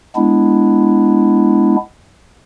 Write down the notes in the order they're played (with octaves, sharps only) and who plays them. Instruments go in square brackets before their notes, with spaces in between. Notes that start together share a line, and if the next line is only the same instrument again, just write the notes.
[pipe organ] G#3 B3 D4 E4